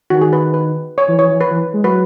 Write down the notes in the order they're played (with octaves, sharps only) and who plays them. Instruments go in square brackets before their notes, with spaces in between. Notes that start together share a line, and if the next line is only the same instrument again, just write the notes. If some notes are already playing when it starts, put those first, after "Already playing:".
[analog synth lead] D#3 [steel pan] F#4
[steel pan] G#4
B4
B4
C#5
[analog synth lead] E3
[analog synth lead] E3 [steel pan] C#5
[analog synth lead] E3
[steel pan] B4
[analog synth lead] E3
G#3
[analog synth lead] F#3 [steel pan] B4